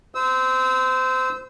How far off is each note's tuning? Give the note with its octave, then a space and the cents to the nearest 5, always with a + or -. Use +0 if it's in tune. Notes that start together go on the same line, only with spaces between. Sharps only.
C5 -25 E6 -25